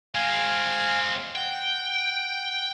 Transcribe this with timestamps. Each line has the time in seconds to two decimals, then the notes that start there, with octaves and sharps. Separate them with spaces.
0.15 G#3 C4 F5 G#5 F6
1.36 F#5 G5